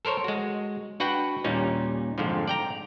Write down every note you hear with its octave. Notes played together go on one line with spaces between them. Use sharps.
A4 A#4 C5 C#5
G#3 F#4
D4 F#4 B4 F#5 G5
D#2 A#2 G3 C#4 D#4
F2 G#2 D3 F3
D5 G5 A#5